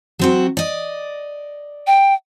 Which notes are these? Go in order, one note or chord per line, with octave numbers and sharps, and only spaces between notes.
F#3 C4 F#4
D5 D#5
G5